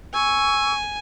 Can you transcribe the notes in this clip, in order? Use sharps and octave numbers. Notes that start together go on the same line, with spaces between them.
G#5 C#6 E6